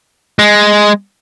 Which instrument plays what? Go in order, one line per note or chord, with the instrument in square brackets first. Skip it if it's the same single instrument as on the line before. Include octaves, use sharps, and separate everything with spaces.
[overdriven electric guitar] G#3